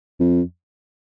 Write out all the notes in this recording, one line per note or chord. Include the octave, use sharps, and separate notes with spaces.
F2